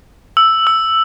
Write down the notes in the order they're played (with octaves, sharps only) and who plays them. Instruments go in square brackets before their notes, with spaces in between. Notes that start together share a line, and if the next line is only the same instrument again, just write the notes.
[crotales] E6
E6